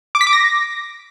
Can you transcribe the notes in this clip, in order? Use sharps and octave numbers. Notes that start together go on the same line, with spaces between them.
D6
B6
D6
A#6